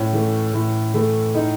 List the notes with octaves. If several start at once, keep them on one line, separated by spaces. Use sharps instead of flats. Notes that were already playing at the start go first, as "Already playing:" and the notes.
Already playing: A2 C#4
E3 A3
A2
E3 A3
A2 D#4